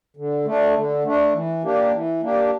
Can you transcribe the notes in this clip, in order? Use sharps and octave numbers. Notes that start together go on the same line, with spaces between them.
D3
A3 D4
D3
A3 D4
E3
A#3 D4 G4
E3
A#3 D4 G4